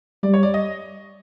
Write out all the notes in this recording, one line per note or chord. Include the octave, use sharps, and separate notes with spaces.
G3 D5
C#5
D5
D#5